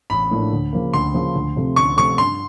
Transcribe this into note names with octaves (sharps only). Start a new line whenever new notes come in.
A1 B5
A2 F3 A#3 D4
D2
C#3 F3 A#3
D2 C6
C#3 F3 A#3
D2
C3 F3 A3 C4
D2 C#6
C3 F3 A3 C4 C#6
G2 C6